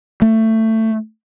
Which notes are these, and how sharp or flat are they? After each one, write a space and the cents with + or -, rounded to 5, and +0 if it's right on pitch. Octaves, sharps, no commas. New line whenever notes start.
A3 +15